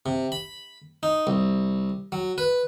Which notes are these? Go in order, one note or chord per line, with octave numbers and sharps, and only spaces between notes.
C3
B5
D#4
C2
F#3
B4